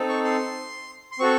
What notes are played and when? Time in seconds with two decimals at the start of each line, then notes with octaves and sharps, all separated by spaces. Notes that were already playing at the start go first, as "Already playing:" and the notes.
Already playing: C4 D#4 A4
0.09 C#6
0.24 C6
1.11 C6
1.19 C4 F#4 A4 C#6